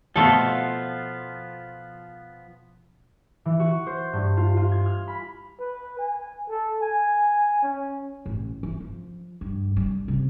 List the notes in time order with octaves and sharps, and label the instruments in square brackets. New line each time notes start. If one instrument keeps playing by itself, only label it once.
[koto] B2 A3 A4 [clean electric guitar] F3 B3 F4
[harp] E3
F#4
C5
G2
F4
F4
G#6
F6
B5
[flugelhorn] B4
G#5
A4
G#5
C#4
[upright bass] A1
E3
F3
G2
G3
C3